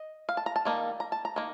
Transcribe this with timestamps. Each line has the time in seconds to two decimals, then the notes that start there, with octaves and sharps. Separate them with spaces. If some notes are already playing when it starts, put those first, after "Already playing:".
Already playing: D#5
0.29 F5
0.37 A5
0.46 A#5
0.56 A5
0.65 D#3 G3 A#3 D#4
1.00 A#5
1.12 A5
1.25 A#5
1.36 D#3 A#3